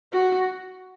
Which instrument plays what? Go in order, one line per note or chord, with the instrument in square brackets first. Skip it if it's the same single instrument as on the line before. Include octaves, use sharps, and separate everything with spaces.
[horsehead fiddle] F#4